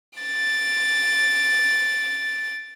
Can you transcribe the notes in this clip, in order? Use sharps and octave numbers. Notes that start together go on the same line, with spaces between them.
A6 D7